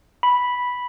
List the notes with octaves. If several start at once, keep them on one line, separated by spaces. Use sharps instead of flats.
B5